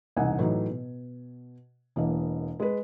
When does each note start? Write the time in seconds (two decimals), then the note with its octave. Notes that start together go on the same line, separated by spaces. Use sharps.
0.16 E1 C2 D#4 F#5 G#5
0.39 A2 E3 F#3 D#4
0.69 B2
1.96 E1 E3 A#3 D#5
2.60 G#3 B4